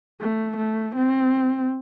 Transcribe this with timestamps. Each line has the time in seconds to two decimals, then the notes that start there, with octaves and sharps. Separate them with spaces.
0.20 A3
0.56 A3
0.95 C4